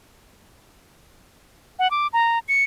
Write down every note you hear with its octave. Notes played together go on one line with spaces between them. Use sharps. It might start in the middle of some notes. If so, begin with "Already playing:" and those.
F#5
D6
A#5
C#7